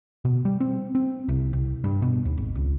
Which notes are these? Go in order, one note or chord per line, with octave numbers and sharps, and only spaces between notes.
B2
G3
C4
C4
C2
C2
G2
B2
D#2
G#1
C#2